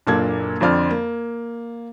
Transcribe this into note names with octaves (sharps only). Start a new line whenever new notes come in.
F#1 A#2 A#3 D4 A4 G#6
F2 D3 C4 D5 F6
A#3